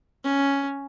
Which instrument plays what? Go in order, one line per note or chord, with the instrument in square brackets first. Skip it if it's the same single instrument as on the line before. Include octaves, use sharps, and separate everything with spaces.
[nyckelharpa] C#4